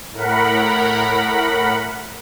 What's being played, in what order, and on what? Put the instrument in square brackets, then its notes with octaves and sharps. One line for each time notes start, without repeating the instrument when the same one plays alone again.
[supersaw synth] A2 A#4 F#5 B5